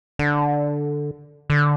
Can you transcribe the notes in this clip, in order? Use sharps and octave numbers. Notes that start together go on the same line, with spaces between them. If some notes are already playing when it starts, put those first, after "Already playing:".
D3
D3